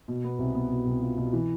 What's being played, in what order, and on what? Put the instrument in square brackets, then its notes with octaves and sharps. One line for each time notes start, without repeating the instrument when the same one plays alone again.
[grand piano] B2
B3
C2
B3
B2
C2
F4
B2
E3